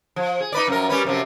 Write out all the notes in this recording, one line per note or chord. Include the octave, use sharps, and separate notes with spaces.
F3
G#4
D#4 B4 D5
F#2 F3 A#4
G3 C#4 B4
F#2 C3 F3